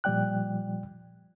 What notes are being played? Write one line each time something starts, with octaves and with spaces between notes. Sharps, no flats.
A#2 F3 G3 D5 G5 F#6